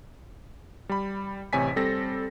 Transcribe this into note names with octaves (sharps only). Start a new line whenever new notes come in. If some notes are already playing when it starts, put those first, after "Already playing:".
G3 B5
A1 C3 C#5 G#5 B6
G3 C4 A4 A#6